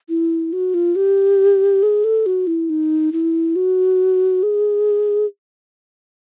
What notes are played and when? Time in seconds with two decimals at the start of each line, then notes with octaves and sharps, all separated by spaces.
0.09 E4
0.53 F#4
0.74 F4
0.96 G4
1.83 G#4
2.04 A4
2.26 F#4
2.47 E4
2.70 D#4
3.13 E4
3.56 F#4
4.43 G#4